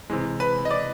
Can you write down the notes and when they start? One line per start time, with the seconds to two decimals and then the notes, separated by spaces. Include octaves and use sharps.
0.10 C3 E3 G#3
0.40 B4
0.65 D#5
0.70 D5